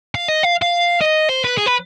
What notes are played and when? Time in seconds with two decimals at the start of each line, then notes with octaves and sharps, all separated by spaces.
0.15 F5
0.28 D#5
0.43 F5
0.62 F5
1.01 D#5
1.29 C5
1.44 B4
1.58 G#4
1.66 B4